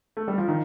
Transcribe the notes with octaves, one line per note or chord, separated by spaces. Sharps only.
A3
G3
F3
D#3